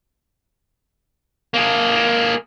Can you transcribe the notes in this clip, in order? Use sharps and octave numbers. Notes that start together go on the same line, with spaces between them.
A#3 G#4